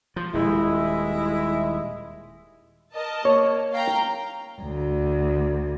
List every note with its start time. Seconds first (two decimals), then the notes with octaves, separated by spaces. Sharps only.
0.16 F3
0.34 D#1 G#3 E4
2.94 A#4 D#5 A5
3.25 A#3 C#5
3.73 F5 G5 A#5
4.61 D2